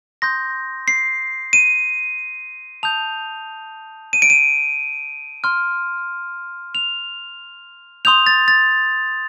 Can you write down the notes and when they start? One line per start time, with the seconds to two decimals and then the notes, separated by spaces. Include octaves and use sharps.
0.22 C6 D#6 G6 A#6
0.88 C7
1.53 D#7
2.83 A5 D#6 G6 F7
4.13 D#7
4.22 D7
4.30 D#7
5.44 C6 F6
6.75 F7
8.05 C6 D#6 G6 F7
8.26 A6
8.48 A6